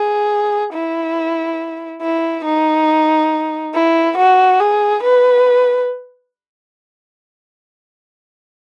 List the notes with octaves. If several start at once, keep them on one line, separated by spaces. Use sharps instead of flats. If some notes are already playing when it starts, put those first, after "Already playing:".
Already playing: G#4
E4
E4
D#4
E4
F#4
G#4
B4